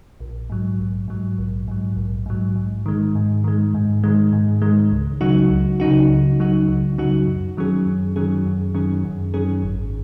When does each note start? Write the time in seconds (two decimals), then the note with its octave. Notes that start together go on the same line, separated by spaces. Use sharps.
0.20 A#1
0.50 G#2 F#3
0.79 A#1
1.08 G#2 F#3
1.38 A#1
1.68 G#2 F#3
1.96 A#1
2.26 G#2 F#3
2.56 G#2
2.86 D#3 G#3
3.15 G#2
3.44 D#3 G#3
3.74 G#2
4.04 D#3 G#3
4.33 G#2
4.62 D#3 G#3
4.92 C#2
5.21 C#3 F#3 D#4 F#4
5.50 C#2
5.80 C#3 F#3 D#4 F#4
6.09 C#2
6.39 C#3 F#3 D#4 F#4
6.68 C#2
6.98 C#3 F#3 D#4 F#4
7.27 F#2
7.57 D#3 F#3 C#4 G#4
7.86 F#2
8.16 D#3 F#3 C#4 G#4
8.46 F#2
8.74 D#3 F#3 C#4 G#4
9.05 F#2
9.34 D#3 F#3 C#4 G#4
9.63 G#1